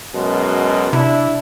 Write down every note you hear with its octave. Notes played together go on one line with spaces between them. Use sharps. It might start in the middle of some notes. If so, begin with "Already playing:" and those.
F#2 B2 G#3
C3 D4 E4